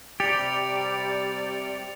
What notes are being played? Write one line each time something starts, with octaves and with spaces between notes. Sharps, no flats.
C3 G3 G4 D5 A6 C#7 F7